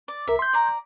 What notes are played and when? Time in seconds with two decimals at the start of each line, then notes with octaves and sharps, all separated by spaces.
0.08 D5
0.27 C2 A#4 E5
0.39 C6 G6
0.53 D5 A#5